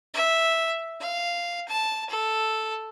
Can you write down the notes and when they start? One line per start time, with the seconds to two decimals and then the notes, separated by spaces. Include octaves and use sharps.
0.14 E5
1.00 F5
1.68 A5
2.09 A4